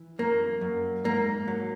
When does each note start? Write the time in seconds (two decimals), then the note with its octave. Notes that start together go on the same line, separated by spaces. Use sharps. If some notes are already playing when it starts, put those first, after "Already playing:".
Already playing: E3
0.19 F#2 A#3
0.61 F#2
1.04 G#2 A#3
1.48 F#3